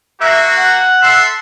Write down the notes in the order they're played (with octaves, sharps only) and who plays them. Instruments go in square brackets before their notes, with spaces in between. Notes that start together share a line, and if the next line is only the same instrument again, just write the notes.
[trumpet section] A#3 F#4 [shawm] E5
[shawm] F#5
[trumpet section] A4 E5 C6